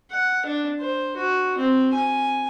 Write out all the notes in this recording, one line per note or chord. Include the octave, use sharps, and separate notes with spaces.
F#5
D4
C5
F#4
C4
G#5